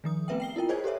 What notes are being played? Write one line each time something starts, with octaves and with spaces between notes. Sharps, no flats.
D#3 F3 D#6
A3 B3 C4 B4 E5 G5
G5 C7 G7
E4 F4 A#4 G5
G#4 C5 C#5 D#5 G#5 G#6
G4 A4 B4 C#5 E5